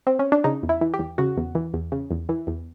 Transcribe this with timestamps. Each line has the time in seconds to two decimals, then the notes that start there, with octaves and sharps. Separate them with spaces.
0.07 C4
0.19 C#4
0.32 D4
0.44 C#3 D#4
0.63 E2
0.69 E4
0.81 E3
0.94 G4
0.99 E2
1.18 C#3 F#4
1.37 E2
1.55 E3
1.74 E2
1.92 C#3
2.11 E2
2.29 E3
2.47 E2